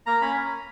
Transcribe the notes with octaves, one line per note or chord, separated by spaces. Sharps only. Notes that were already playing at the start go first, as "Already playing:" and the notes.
A#3 A#5
C#4 B5